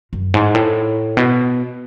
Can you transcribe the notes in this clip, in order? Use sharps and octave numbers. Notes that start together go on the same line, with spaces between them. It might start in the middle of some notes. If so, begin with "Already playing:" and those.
F#2
G#2
A2
B2